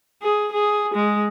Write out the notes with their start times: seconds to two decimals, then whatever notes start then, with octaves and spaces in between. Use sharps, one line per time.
0.23 G#4
0.53 G#4
0.94 G#3